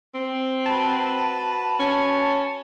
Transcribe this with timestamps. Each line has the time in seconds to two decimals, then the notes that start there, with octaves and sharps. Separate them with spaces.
0.15 C4
0.66 F#4 B4 A5
1.79 C#4